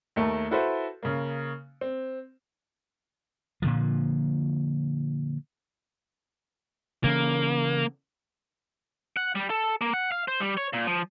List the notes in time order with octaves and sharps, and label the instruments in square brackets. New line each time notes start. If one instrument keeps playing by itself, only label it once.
[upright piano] D#2 A3 A#4 A5
E4 F#4 A4 B4 C5 E5
C#3 A#3
C4
[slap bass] A#2 D3 F3
[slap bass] C#3 E3 C#4 [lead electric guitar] A#3
[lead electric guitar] F#5
G3
A4
A#3
F#5
F5
C5
G3
C#5
A#2
F3